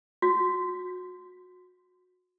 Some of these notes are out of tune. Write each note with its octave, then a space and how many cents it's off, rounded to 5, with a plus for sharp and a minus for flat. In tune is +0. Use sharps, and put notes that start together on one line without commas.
F#4 -25